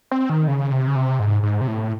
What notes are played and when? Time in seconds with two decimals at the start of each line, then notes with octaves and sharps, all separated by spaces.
0.11 C4
0.30 D#3
0.48 C#3
0.71 C3
0.87 C#3
0.96 C3
1.19 G#2
1.43 G#2
1.61 C3
1.68 A2